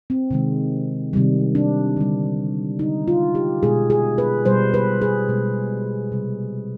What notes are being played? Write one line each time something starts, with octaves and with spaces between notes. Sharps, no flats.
C4
C3 D#3 G#3
C3 D#3 G3
D4
D3 G3
D3 G#3 D#4
F4
G4
B2 G#3 G#4
G#4
B4
B2 G3 C5
B4
G#4
B2 G#3
C3 G3